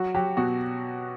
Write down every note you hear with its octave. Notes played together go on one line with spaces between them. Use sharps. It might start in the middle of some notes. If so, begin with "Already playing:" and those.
Already playing: F#3 F#4
F#3 G4
B2 F#4